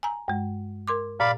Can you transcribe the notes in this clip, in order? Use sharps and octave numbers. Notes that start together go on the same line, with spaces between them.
G#5 A#5
G2 G#3
A#4 C6 D6
A#2 D5 F5 B5